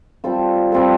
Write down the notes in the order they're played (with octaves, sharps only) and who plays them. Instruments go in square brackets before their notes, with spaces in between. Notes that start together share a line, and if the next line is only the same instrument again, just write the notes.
[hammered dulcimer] G3 C4 F4 A4
G3 C4 F4 A4